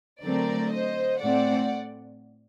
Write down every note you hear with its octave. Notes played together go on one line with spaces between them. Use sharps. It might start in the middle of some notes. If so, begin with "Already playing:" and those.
D3 F#3 A3 C4 A#4 D5
C5 D#5
A2 A3 C4 D5 F#5